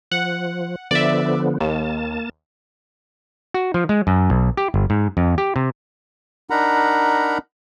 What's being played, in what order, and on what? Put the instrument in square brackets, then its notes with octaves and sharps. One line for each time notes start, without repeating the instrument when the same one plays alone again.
[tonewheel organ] F3 [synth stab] F#5
[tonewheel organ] D3 F3 B3 [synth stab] D5 E5
[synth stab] D#2 [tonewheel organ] A#3 A5
[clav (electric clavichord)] F#4
F3
G#3
F#2
B1
G4
G1
G#2
F2
G4
C3
[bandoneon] D4 D#4 A#4 F#5 A#5 B5